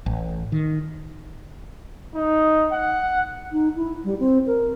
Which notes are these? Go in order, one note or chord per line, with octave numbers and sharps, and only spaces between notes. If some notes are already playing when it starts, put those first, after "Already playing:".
A1
D#3
D#4
F#5
D#4
E4
G3
C4
A#4